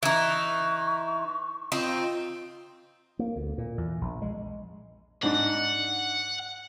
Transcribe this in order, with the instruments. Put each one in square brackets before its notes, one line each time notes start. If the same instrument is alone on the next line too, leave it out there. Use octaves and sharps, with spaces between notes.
[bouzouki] E3 D#4 [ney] C#6
[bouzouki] C4 D#4 [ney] F4
[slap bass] A#3
D2
A#2
E2
A#1
G#3
[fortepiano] G#2 D4 D#4 [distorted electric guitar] F#5